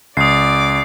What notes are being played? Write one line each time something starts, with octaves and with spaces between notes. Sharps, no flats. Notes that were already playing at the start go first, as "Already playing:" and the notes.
C#2 D5 D6 D#6 C7